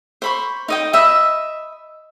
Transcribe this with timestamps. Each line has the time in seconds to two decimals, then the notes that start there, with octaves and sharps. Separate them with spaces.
0.22 C5 B5 C#6
0.68 D#4 D#5 G5
0.93 D#5 E5 B5